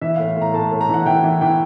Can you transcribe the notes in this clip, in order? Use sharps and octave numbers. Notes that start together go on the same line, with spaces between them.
E3 E5
A2 F5
A2
A#5
A2 A5
A2
A#5
E3 F#5
E3 G5
E3
E3 G5